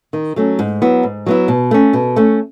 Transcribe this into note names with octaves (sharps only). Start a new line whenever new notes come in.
D#3
F#3 A3 C#4
G#2
F#3 B3 E4
G#2
F#3 B3 E4
B2
A3 C#4
B2
A3 C#4